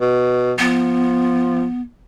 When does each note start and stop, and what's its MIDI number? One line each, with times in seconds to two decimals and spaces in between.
0.01 0.54 47
0.59 1.66 53
0.59 1.81 59